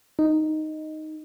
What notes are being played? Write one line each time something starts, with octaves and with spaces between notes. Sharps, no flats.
D#4